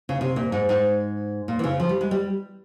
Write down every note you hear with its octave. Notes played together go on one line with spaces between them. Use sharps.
C#3
C3
A#2
G#2
G#2
A#2
E3
C#3
F3
G3
G#3
G3